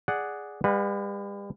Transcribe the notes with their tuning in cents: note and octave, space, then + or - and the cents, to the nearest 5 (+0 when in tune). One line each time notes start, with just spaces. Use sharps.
G#4 +0 D5 +0 F#5 +0
G3 +40 B4 +0 F#5 -35